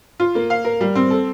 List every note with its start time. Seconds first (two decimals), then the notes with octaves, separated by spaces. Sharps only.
0.20 F4
0.35 A#3
0.50 F5
0.65 A#4
0.81 G3
0.95 C4
1.11 A4